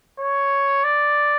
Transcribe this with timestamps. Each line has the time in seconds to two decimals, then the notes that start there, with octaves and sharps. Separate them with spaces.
0.20 C#5
0.84 D5